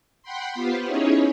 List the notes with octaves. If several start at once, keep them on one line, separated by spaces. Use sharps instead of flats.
F#5 G5 B5 C6
B3 F4 G4 B4 C5
C#4 D#4 E4 G#4 C#5